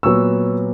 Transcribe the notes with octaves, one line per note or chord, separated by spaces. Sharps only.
A#2 F#3 B3 C#6 E6